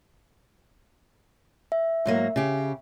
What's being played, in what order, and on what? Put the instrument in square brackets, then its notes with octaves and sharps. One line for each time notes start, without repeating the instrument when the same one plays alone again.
[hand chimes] E5
[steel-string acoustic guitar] G#2 F#3 A#3
C#3 G4